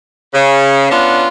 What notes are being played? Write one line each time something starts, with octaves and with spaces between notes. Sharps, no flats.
C#3
B3 C#4 D4 F4